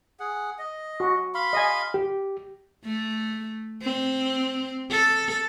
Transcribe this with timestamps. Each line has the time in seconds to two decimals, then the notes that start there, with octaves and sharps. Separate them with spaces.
0.20 G#4 F#5
0.59 D#5
1.00 F#4
1.34 F5 B5 C6
1.53 D#5 G#5
1.94 G4
2.84 A3
3.82 C4
4.91 A4